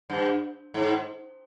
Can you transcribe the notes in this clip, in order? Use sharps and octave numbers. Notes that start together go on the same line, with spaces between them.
G2
G#2